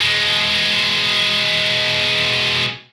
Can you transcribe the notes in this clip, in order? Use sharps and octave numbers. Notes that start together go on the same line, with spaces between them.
B2 G#3